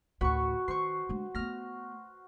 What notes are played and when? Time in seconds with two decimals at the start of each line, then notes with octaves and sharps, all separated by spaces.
0.21 A1 D2 F#4 B4 C#6
0.68 D#3 C5 C#6 C7
1.09 G#3 D4
1.35 A3 B3 F6 A#6